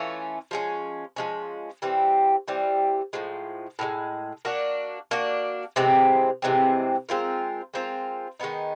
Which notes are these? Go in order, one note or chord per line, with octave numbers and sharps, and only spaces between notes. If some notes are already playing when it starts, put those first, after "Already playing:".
Already playing: E3 A3 C#4 F4
F3 G#3 C#4
F3 G#3 C#4
E3 G3 C4
E3 G3 C4
A2 F3 G#3
A2 F3 G#3
A#3 D4 F#4
A#3 D4 F#4
C3 E3 G#3 C4
C3 E3 G#3 C4
G#3 C4 F4 A#4
G#3 C4 F4 A#4
D#3 G#3 B3 D#4